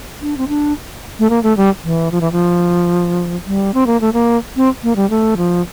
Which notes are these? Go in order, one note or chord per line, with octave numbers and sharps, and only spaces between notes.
D4
C4
D4
A3
A#3
A3
G3
E3
F3
E3
F3
G3
C4
A#3
A3
A#3
C4
A#3
G3
A3
F3